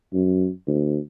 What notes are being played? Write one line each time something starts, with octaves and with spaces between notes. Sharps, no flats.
F#2
D2